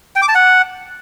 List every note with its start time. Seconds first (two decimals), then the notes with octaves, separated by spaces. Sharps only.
0.16 G5
0.22 D6
0.28 A5
0.35 F#5